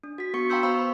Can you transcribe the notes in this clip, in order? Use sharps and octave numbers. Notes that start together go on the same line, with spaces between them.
D4
F#4 B6
B3 F#4 C#6 C#7
F5 G5 A#5 C6 E6 G6
B3 C5 F5 B5 C#6 E6
B5